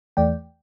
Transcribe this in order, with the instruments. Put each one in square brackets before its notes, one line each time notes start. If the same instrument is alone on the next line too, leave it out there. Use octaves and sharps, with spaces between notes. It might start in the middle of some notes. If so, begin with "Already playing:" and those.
[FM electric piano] E2 E3 A3 D5 G5